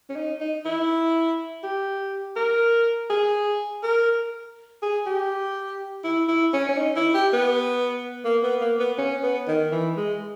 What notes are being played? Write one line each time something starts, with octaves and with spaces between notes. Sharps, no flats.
C#4
D#4
D#4
E4
G4
A#4
G#4
A#4
G#4
G4
E4
E4
C#4
C#4
D#4
E4
G4
B3
A#3
B3
A#3
B3
C#4
B3
D#3
E3
G#3